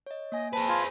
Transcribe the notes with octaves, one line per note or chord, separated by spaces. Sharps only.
C#5 D#5
A#3 D#5 G#5
G#4 B4 C5 A5
F4 G#5